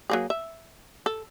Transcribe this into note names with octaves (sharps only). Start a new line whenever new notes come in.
F#3 A#3 G#4
E5
A4